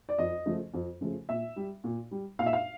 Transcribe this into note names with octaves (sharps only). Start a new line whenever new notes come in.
D5
F2 D#5
C#3 F3 A3
F2
C#3 F3 A3
A#2 E5
G3
A#2
G3
A#2 F5
E5
F5